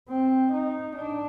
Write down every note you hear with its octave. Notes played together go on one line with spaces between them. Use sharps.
C4
D#4
D4